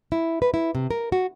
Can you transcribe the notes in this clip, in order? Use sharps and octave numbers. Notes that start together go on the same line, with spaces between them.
E4
B4
E4
C3
A#4
F#4